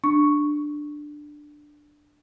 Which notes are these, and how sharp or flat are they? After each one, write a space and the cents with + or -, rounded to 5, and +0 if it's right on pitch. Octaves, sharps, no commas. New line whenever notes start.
D4 +10 C#6 +0